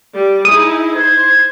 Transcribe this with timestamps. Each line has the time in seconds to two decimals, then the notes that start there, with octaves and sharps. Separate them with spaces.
0.14 G3
0.45 D#4 E4 G#4 D#6
0.96 C5 G#6